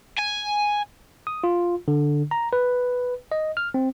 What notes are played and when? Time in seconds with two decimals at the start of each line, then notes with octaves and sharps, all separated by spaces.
0.18 G#5
1.27 D#6
1.44 F4
1.88 D3
2.31 A#5
2.53 B4
3.32 D#5
3.57 F6
3.74 C4